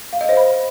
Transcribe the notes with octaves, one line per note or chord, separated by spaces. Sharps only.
F5
D#5
C5
B5